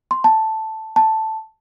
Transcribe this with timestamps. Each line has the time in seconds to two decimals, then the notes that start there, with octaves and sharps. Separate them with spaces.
0.11 C6
0.24 A5
0.96 A5